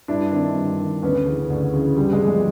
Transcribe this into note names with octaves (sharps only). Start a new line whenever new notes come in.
G2 D4 E4
D#3 C4 D4
G2
D#3
D2 B3 C#4
C#3 E3
D2
C#3 E3
G2 G3
G#3
D3 F3
G#3